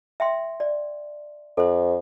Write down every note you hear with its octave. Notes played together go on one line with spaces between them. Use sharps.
E5 G5 C6
D5
F2 A4 C5